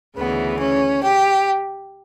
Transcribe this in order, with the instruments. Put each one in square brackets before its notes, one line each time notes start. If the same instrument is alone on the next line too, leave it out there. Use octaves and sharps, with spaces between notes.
[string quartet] D2 C#3 E3 B3
C#4
G4